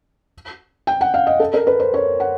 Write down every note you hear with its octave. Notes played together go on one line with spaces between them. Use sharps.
G5
F#5
F5
D#5
A4
A#4
B4
C5
C#5
F#5